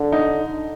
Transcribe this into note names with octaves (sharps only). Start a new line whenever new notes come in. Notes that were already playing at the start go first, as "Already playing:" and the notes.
Already playing: D3
D#4